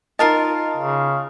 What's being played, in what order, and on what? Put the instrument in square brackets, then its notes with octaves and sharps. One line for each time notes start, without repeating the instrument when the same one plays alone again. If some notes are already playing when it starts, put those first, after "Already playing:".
[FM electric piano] D#4 D#5 [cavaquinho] F4 A#4 A5
[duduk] C#3